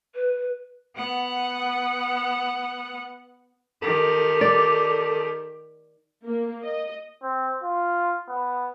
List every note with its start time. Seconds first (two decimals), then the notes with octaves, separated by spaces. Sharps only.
0.15 B4
0.96 B3 F#5
3.82 D#3 G4 A4
4.41 D5
6.25 A#3
6.63 D#5
7.23 C4
7.63 F4
8.29 B3